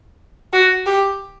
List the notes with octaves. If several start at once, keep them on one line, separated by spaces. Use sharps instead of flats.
F#4
G4